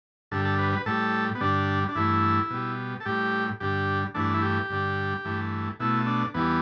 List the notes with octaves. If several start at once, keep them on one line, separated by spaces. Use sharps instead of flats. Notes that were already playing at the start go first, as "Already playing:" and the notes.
G2 D3 G3 A4
A4
B4
B4
A2 G3 A4
B3
G2 D3 G3 D4
D4
G2 E3 A3 E4
B2 G3
A4
A2 G3 G4
G2 D3 G3 G4
G2 E3 A3 D4
E4
G4
G2 D3 G3
G2 E3 A3
B2 A3 E4
D4
E2 E3 G3 B3